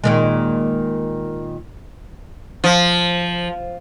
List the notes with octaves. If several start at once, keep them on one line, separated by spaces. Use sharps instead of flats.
A#2 D#3 G#3
F3